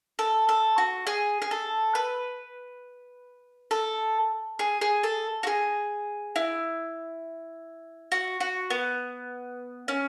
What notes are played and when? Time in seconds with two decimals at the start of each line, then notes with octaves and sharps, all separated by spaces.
0.19 A4
0.49 A4
0.78 F#4
1.07 G#4
1.42 G#4
1.51 A4
1.95 B4
3.71 A4
4.59 G#4
4.81 G#4
5.03 A4
5.43 F#4
5.47 G#4
6.36 E4
8.12 F#4
8.40 F#4
8.70 B3
9.88 C#4